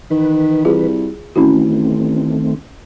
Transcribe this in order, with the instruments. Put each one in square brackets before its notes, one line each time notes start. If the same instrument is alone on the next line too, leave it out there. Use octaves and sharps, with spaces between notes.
[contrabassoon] D#3 [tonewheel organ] E3 B4
[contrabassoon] C2 [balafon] F4 G#4
[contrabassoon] A1 [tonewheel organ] D#3 A3 C4 [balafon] C#4 E4 F#4